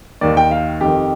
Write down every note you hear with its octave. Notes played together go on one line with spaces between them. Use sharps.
D#2 D#3 D5
G5
F5
F2 D#3 G4